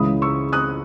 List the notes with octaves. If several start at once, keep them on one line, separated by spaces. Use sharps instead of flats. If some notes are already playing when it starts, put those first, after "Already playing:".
Already playing: C#2 C#3 E3 G#3 B5 D#6
C#6 E6
D#6 F#6